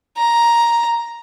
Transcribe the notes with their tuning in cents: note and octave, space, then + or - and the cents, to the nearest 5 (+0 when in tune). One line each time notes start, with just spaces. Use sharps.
A#5 +5